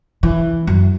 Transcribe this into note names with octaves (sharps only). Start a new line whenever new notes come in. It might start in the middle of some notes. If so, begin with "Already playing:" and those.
E3
F#2